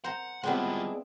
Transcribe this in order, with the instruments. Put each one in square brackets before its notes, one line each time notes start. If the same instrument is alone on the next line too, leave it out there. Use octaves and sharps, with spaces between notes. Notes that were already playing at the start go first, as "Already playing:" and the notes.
[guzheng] C5 A#5 [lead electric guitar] F#5
[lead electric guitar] G3 F4 [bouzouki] G#3 D4 E4 [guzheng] B3 C4